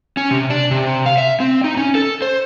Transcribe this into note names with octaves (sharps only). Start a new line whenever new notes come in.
C#4
C3
D4
C3
F5
E5
C4
D#4
C#4
A4
C5